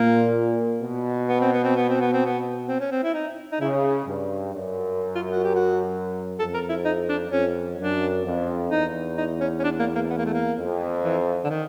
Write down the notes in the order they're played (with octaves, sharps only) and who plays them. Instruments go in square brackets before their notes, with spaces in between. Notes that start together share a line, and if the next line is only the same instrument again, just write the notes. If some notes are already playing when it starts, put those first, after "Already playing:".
Already playing: [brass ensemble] A#2 [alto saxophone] A#3
[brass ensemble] B2
[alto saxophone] B3
C4
B3
C4
B3
C4
B3
C4
B3
C4
C#4
C4
E4
D#4
D#4
[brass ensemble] C#3 [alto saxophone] E4
[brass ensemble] G2
F#2
[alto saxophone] F4
F#4
G4
F#4
[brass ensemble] F2 [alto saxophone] A4
[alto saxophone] A#4
E4
D#4
D4
[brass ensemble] F2 [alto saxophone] C#4
[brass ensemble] F#2 [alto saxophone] D4
[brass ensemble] F2
[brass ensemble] E2 [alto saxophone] D#4
[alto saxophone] D#4
C#4
C#4
D4
A#3
A#3
B3
A#3
A3
A#3
[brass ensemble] F2
[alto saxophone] E3
D3
D#3